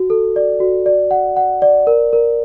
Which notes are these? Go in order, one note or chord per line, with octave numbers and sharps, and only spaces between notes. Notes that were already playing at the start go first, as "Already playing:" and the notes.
Already playing: F#4
A4
D5
F#4
D5
F#5
F#5
D5
A#4
A#4